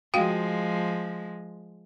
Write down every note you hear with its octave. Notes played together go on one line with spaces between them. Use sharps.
F3 G#3 F#4 F5 G5